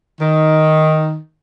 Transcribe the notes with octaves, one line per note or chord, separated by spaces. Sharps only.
D#3